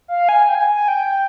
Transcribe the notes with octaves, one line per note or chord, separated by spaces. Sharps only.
F5
G#5
G5
G#5
G#5
G5